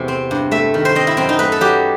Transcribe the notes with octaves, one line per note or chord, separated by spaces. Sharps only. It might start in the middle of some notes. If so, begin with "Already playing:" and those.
Already playing: E2 C3 A3
C4
G2
A3 E5
D#3
C5
C4 D#5
E4
F#2 C4
D#4
A3 B4
A4
F#3 G4